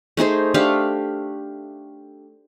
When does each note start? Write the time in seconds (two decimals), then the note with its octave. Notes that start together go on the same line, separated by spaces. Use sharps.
0.17 A3 D#4 G#4 C5
0.54 A3 D4 G4 F5